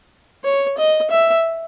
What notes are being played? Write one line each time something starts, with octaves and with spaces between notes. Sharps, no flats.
C#5
D#5
E5